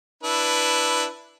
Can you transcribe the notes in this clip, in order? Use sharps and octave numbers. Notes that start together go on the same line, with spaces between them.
D4 E4 B4